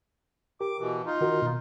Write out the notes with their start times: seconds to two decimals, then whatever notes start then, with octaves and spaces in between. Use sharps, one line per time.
0.60 G4 A#4 D6
0.79 B2 E3
1.06 D#4 F4
1.21 D#3 F#4 A#4
1.42 B2